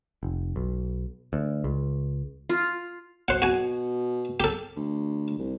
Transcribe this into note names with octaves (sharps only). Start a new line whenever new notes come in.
F1
B1
D2
C#2
F4
B2 C5 F#5
F#4 G#5
G4 A4
D2
C2